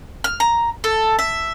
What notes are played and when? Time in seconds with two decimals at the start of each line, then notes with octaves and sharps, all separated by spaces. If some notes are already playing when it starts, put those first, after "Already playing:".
0.24 F6
0.40 A#5
0.84 A4
1.19 E5